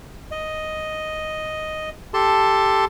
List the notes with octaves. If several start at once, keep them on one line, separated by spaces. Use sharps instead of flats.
D#5
G4 A4 A5 C6